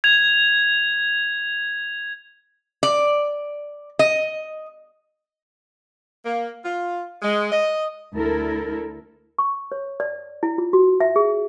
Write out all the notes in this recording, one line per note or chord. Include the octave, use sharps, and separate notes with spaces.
G#6 F7
D5
D#5
A#3
F4
G#3
D#5
D2 E4 A4 A#4
C#6
C#5
D5
E4
F4
F#4
E5
G#4